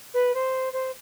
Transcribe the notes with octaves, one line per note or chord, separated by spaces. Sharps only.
B4
C5
C5